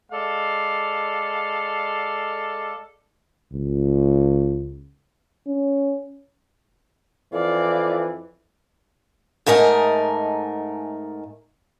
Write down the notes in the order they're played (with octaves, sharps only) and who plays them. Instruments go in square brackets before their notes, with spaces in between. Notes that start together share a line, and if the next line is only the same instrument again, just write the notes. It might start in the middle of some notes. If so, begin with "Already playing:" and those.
[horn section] G#3 A4 D5 F5
[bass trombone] C#2
C#4
[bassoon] F2 [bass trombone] E3 [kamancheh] D5 F5
[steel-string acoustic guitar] G#2 A3 A#4 D#5 G#5